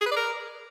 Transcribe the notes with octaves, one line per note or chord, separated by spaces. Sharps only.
G#4
B4
D5
A#4